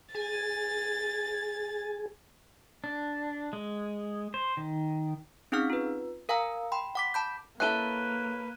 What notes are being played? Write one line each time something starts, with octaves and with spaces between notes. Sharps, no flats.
G#4 G#5 A6
D4
G#3
C5
D#3
C4 C#4 D#4 G#4 F#5 F6
F4 B4
A#4 F5 G#5 A#5 E6
G5 B5 C6
F#5 D6 B6
A5 B5 G6
A#3 C#4 E4 A4 B4 F#6 D#7 G7